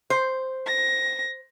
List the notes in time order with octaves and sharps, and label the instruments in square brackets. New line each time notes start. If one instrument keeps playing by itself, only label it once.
[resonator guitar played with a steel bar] C5
[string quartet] A#6